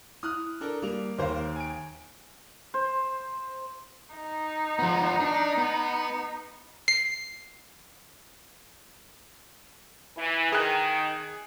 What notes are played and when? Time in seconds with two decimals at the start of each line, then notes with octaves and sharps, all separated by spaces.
0.23 E4 D#6 F6 F#6
0.60 D4 A4 A#4
0.82 G3 A#3 F7
1.18 D#2 A#3 C5 F5
1.56 G#5 D7
2.74 C5
4.16 D#4
4.79 F3 B3
5.20 D4
5.57 B3
6.88 C7
10.17 E3
10.52 D#3 G#4 F#6